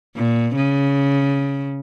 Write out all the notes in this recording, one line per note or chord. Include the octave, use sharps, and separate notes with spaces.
A#2
C#3